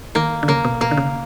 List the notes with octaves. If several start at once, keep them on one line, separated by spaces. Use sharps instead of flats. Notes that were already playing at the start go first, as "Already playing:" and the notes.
D#3 A#3
D3
C#3 A#3
B2
B2 A#3
D3
C#3